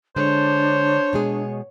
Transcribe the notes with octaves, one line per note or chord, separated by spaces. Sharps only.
D3 G#3 D4 C5 C#5
B2 G#3 G#4